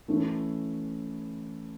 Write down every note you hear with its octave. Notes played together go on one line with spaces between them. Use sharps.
E3 A3 C#4 E4